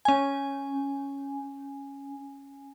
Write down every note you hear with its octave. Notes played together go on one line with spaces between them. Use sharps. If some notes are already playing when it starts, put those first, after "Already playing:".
C#4 G#5